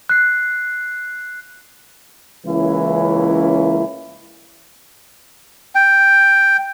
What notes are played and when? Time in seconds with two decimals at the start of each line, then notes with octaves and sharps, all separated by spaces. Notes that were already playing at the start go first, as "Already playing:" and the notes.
0.09 F#6 C7
2.46 C#2 E3 A#3 C#4 E4
5.75 G5